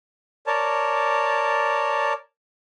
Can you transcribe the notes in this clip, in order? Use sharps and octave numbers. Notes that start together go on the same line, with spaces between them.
A#4 C#5 D5 A5